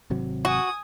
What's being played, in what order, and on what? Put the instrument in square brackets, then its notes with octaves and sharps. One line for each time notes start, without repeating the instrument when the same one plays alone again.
[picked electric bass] G#1 C3 F#3
[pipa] F#4 [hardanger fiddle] G#5 D#6